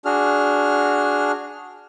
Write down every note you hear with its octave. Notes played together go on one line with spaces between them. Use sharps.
D4 F#4 G#4 F6